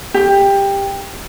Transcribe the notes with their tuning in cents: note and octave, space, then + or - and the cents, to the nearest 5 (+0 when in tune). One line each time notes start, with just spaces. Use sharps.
G4 +15